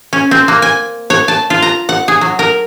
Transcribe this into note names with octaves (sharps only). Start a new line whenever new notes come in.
C#4
C4
A#3
G#5
C#5
A5
F4
A#5
F#5
G#4
F#3
A#4